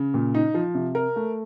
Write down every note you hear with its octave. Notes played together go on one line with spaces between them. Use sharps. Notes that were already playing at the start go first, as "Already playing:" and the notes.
Already playing: C#3
A#2
D#4
F3
C3
A#4
A3